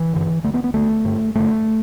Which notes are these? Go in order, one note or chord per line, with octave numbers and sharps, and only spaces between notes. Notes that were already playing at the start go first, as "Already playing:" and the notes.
Already playing: E3
G2 D3
D2 D3 A3
B3
B3
D2 D3 A3
G2 D3
G2 D3 A3